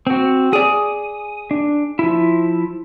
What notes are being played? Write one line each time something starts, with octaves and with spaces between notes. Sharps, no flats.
C4 F#4
G#4 D5 D#6
D4
F3 E4